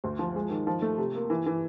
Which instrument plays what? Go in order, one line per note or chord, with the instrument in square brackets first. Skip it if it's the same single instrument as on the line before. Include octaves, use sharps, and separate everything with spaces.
[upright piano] D2
F3
G#3
D#3
F3
A3
C3
A#3
E3
E3